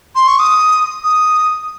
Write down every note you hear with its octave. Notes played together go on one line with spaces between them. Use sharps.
C6
C#6
D#6
D#6